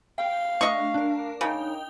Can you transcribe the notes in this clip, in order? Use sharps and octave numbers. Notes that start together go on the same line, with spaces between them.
F5 G5
A3 D4 D#5 C#6
D4 A#4
C#3 D#4 G5